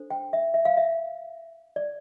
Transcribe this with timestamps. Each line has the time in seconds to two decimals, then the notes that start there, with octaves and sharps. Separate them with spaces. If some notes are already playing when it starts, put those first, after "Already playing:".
Already playing: D4 A4 C5
0.10 G5
0.33 E5
0.54 E5
0.65 F5
0.77 E5
1.76 D5